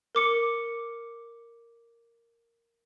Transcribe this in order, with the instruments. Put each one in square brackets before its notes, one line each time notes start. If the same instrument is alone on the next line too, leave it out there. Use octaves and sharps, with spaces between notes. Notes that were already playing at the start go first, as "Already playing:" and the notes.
[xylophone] A#4 D6 C#7